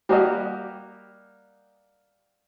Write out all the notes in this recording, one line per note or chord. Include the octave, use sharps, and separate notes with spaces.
G3 A#3 F#4 G4 A#4 D#5